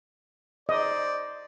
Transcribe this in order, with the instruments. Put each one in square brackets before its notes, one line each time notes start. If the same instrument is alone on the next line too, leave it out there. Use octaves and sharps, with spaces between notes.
[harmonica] C5 D5 [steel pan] D#5